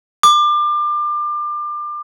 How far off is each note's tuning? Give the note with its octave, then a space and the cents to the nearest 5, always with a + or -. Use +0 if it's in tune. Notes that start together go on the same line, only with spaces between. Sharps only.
D6 +30